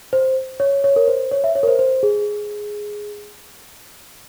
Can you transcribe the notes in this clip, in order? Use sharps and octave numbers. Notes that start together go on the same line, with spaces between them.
C5
C#5
C#5
A#4
C5
C#5
E5
C#5
A#4
C5
C5
G#4